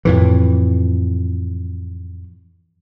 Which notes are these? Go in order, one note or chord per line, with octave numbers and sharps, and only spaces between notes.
F2 A2 E3